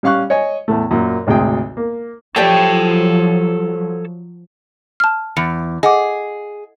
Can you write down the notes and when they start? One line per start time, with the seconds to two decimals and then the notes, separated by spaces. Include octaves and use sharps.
0.03 G3 C#4 F5 C#6 F#6
0.30 C#5 D#5 G#5
0.68 E2 A2 A3
0.91 F#2 A#2
1.27 G#1 D2 C3 G#4 G5
1.77 A#3
2.36 F3 F#3 G4 A4 C#5 D5 G5 A5
5.00 A5 F6
5.37 E2 C#7
5.83 G#4 D#5 F#5 D6